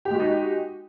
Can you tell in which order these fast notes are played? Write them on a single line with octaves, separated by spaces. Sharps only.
G4 G#3 F#4 D#4